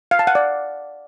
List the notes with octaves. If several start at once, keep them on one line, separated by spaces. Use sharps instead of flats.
F5
A5
F#5
D5